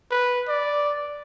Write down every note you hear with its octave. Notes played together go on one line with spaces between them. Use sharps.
B4
D5